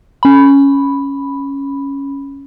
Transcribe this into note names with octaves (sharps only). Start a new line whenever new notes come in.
C#4 B5